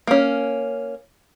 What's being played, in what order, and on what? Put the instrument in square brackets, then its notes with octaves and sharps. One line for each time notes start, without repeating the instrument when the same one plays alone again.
[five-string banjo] A#3 C#4